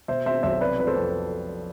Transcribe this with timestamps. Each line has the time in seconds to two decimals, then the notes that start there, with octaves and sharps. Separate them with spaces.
0.08 B2 C5 E5
0.26 C4 C5 E5
0.43 B1 C5 E5
0.61 C3 B4 D5
0.78 F2 B4
0.87 A4 C5
0.96 F2